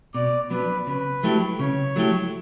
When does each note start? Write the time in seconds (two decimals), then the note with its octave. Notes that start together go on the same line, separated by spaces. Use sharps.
0.14 B2 D5
0.50 F#3 B3 D4 B4
0.86 C#3 B4
1.23 F#3 A3 E4 G4
1.59 C#3 C#5
1.96 F#3 A3 E4 G4